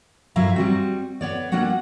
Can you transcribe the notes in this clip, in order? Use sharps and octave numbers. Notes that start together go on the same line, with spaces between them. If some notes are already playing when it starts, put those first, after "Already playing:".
F#2 F#3 E4 E5 F5 A#5
G3 C4 F#4
B3 C#5 D5
G3 A#3 D4 F#4 F#5